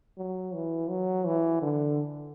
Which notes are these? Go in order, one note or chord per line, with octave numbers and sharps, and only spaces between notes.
F#3
E3
F#3
E3
D3